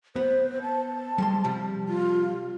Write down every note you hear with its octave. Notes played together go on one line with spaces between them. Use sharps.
B3 C5
A5
G3 G#3 C6
C3 F3 G3
F4